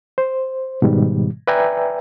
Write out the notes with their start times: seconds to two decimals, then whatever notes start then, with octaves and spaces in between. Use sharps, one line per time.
0.18 C5
0.82 G#2 B2 D#3 G3
1.47 B4 D5 E5 G5 G#5 A#5